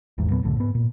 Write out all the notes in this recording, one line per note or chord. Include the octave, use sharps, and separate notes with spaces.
D#1 A1 E2 G#2
E2 A#2 F#3 B3
F1 C2 A2 D3
G#2 B3
A#2